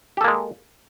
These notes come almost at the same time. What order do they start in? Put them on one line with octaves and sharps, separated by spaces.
G4 A4 A#3 G#3